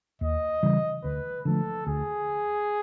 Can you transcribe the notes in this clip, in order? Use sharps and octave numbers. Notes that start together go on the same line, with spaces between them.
D#2 D#5
C#3 E3 G3
D2 B4
D3 F3 A3 A4
D2 G#4